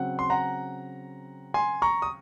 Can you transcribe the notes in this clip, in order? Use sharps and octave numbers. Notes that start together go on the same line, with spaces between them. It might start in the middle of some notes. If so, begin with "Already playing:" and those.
Already playing: C#3 F#3 C4 F#5
C6
F#5 A#5
G#5 C6
A#5 C#6
D#6